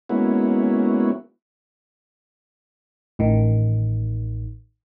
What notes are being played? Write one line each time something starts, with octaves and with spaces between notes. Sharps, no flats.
G#3 A#3 B3 C#4 E4 F#4
A1 D#3